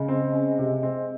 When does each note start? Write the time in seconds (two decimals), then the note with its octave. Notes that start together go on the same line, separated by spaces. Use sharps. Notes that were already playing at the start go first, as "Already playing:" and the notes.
Already playing: C#3 G#3
0.08 C4
0.33 C#4
0.58 C3
0.83 C4